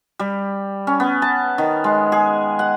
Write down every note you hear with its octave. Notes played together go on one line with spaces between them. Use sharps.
G3
C#4
B3
A5
D#3
G#3
G#4
F#5